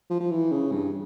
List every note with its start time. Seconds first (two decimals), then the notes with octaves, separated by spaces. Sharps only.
0.10 F3
0.20 F3
0.30 E3
0.52 C#3
0.72 G2